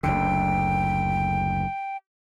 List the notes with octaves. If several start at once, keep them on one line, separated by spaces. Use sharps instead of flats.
F#1 D2 D3 G5